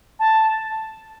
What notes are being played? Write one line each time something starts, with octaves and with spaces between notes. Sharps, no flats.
A5